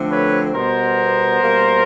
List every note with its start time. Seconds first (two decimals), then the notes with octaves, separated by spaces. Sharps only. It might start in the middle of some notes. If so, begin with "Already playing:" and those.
Already playing: D3 F3 A3 C4
0.10 B4 C#5
0.54 B2 G3 B3 A#4 C5
1.42 B2 G3 A#3